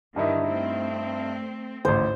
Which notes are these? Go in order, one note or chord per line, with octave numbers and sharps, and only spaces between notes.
G2 D3 D#3 D#4 E4
A3 C4
A1 D2 G#2 C5